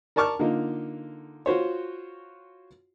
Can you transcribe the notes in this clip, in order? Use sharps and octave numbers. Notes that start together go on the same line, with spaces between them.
A#4 D5 A5 C#6 D6 F6
D3 A#3 D#4 F4
F4 F#4 C5 C#5